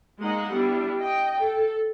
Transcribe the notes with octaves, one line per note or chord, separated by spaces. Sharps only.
G#3 A#3 D#4 D#5 F#5
G3 B3 D4 E4
D#5 G5
A4